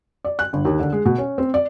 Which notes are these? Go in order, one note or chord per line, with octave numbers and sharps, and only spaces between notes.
D5
F#6
G1
D#2
D3
G#3
B2
C#4
C4
D5